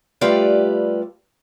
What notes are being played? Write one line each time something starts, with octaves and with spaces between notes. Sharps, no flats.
G3 A3 F4 G4 B4 D5